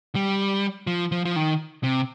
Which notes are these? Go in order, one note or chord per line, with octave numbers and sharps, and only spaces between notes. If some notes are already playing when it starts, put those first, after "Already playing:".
G3
F3
F3
F3
D#3
C3